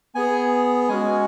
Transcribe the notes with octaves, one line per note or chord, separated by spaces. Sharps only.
B3 G#4 G#5
G#3 C#4 F#4 G#5